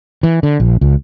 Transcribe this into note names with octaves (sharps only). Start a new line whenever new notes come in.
E3
D3
A#1
C#2